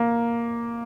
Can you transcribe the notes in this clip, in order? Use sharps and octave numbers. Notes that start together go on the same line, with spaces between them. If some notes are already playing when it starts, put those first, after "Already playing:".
Already playing: A#3